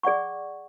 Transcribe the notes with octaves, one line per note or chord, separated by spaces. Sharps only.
G#4 D5 F#5 C#6